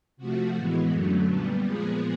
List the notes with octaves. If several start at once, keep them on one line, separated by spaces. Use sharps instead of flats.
C3 F3 A3 F#4
A2 E3 G#3 B3
F#2 D3 F#3 A3
A#2 G3 B3
A#2 F3 G#3 B3 G#4